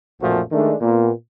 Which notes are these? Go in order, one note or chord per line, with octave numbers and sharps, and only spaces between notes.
B1 F#2 A#2 F3 A3 F#4
D#3 G#3 A3 D4
A#2 B3